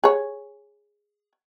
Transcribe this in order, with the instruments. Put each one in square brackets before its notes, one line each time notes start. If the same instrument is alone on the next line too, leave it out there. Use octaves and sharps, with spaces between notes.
[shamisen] G#4 C#5